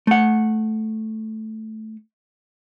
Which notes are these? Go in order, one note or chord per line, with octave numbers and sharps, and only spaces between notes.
A3 F#5